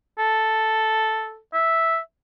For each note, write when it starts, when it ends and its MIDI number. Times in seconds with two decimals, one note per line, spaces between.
0.18 1.38 69
1.54 1.99 76